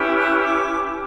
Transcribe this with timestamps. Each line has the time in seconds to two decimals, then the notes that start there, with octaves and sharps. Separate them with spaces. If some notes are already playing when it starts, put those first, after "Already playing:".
Already playing: C#4 E4 G4 B4
0.17 F#6
0.43 D6